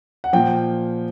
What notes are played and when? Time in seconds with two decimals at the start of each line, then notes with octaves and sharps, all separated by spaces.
0.24 F#5
0.33 A#2 F3 G5